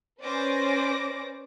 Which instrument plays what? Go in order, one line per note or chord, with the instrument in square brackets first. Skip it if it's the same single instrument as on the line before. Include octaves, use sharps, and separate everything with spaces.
[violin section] C#4 B4 C5 D5 D6 A#6